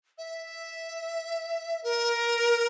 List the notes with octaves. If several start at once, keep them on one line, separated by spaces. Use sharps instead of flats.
E5
A#4